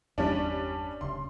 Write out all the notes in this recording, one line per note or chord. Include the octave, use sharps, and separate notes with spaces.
G1 E2 G3 C#4 D4
D1 C#3 C6